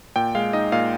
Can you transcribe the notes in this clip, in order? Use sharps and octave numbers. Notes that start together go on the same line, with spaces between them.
A#2 G5
G#3 F5
D#4 D#5
A#2 F5